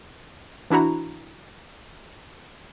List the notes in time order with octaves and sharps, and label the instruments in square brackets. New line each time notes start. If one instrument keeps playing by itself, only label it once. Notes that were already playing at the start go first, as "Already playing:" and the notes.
[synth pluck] E3 D4 E4 F#4 A#5